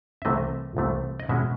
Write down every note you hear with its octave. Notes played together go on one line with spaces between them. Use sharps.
E5
C2 C3 E3 A3 D#5
C2 C3 E3 A3
D#5
B2 G#3 C#4 E4 E5